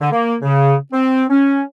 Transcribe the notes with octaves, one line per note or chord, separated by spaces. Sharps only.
D3
A#3
C#3
C4
C#4